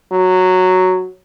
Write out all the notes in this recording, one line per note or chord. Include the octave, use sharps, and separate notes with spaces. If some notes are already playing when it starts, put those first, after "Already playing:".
F#3